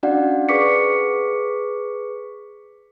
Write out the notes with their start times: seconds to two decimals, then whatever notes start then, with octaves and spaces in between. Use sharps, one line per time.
0.03 C#4 D4 F#4 D5 F5 F#5
0.49 G#4 B4 C#6 D6 B6 C#7